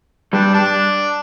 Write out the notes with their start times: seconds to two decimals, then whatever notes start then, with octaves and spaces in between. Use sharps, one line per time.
0.33 G2 G3 D4
0.54 D4